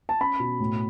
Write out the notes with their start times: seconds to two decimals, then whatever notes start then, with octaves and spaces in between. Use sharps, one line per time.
0.09 A5
0.21 C#4 B5
0.40 B2
0.60 A2